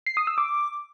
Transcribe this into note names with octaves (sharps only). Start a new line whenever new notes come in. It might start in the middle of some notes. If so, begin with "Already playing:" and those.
C7
D#6
E6
D6